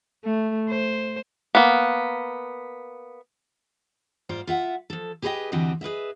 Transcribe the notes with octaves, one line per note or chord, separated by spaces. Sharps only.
A3
C5
A#3 B3
G#2 F4 C5 D5
F4 E5 F#5
F3 A4
G4 G#4 B4 C5 D#5 G5
D2 E3 C4 F#4 G4 D#5
G#4 B4 D#5 E5